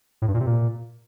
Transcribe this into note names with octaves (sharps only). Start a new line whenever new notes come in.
A2
G2
A#2
C3
A#2